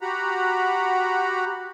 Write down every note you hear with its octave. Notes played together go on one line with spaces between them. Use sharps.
F#4 G4 F#5 A#5 B5